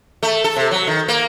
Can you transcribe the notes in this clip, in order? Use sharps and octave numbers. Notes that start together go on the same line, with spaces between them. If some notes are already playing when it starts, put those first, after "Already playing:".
A3
A4
C3
F#3
D#3
A#3